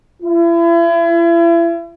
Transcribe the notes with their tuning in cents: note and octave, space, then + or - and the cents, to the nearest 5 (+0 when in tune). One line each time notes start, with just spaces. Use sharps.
E4 +40